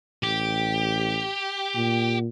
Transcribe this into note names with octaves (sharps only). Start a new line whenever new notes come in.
A1 G4
A#2